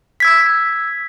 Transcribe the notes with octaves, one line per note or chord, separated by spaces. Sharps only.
E6 G#6 B6